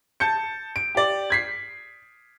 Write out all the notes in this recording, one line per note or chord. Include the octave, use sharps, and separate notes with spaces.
A5 G6 C#7
D7
G4 D5
G#6 B6 C7